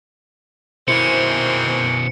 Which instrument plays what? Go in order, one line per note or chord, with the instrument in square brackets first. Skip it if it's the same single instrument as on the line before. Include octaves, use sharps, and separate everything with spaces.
[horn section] G#2 A#3 C4 [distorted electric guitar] B2 C#4 [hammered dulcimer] E4 C5 [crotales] C#7